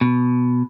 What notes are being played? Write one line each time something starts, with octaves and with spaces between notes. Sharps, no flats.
B2